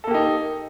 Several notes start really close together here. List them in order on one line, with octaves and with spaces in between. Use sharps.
A4 A#3 G4 D#4